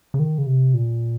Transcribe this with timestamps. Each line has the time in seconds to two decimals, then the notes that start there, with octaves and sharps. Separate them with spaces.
0.14 C#3
0.19 D#3
0.38 C#3
0.46 C3
0.74 A#2